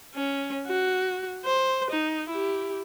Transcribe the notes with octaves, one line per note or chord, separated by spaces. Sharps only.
C#4
F#4
C5
D#4
E4 G4